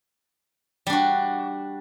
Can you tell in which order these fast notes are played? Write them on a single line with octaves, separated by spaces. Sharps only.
G3 D4 F#4